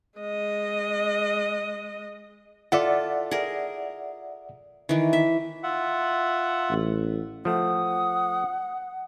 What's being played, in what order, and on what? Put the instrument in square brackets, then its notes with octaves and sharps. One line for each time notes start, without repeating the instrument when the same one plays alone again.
[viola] G#3 D#5
[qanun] F4 A4 [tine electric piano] D5 E5 F#5
[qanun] G#4 A#4
D#3 E3
E5
[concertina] F4 E5 F#5
[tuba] A1
[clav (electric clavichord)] F3 A3 [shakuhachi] F#5 [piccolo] D#6